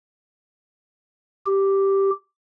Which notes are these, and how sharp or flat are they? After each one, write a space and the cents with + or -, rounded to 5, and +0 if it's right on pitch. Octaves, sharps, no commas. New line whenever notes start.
G4 -5